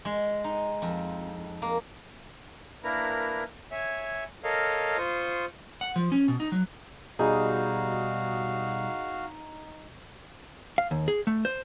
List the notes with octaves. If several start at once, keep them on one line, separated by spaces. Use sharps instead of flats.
G#3
D#4
F2
A#3
A#3 D4 E4 A#4 B4 A#5
C#5 E5 G#5
A4 A#4 C#5 D#5 F5
F4 C5 C#6 D#6
F#5
F3
C#4
B2
D#4
F#3
B2 G3 D#4 F#4 G#4 F5
F5
D#2
G#4
A3
C5